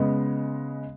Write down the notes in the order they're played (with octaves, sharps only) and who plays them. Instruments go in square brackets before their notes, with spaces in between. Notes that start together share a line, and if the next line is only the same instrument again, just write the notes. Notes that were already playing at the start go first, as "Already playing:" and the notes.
Already playing: [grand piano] C#3 G#3 B3